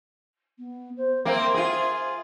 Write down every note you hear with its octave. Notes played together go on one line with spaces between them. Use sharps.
B3
C5
A#3 C4 E5
F4 G#4